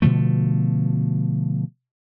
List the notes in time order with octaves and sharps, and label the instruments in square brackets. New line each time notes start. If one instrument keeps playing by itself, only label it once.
[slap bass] B2 D3 F3 A3